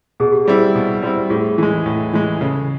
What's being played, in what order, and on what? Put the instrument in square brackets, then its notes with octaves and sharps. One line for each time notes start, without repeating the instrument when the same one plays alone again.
[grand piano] B2 [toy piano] G#4
[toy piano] G4
[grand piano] G3 C4 E4 [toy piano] G#4
[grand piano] B2
G3 C4 E4
[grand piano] A2 [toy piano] G#4
[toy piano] G#4
[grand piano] E3 G#3 [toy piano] A4
[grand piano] A2
E3 G#3
[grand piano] C#3 [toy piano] A4